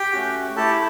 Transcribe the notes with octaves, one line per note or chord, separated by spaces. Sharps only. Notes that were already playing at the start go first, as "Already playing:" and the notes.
Already playing: G4 G5
A3 C#4 F#4
A3 E4 G4 A4 A5